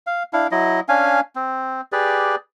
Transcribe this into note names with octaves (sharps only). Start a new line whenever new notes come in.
F5
D4 E4 F5
F#3 E4 D#5
C#4 D4 F5 G#5
C4
G4 G#4 B4 D5